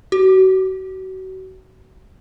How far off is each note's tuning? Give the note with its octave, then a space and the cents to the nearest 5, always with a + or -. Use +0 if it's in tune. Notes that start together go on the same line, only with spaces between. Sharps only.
F#4 +35